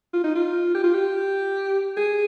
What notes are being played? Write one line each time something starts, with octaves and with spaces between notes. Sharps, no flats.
F4
D#4
F4
G4
F4
G4
G#4